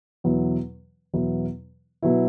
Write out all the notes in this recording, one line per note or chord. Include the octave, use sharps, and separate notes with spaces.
E2 B2 F#3 B3 E4
E2 B2 F#3 B3 E4
B2 F#3 B3 E4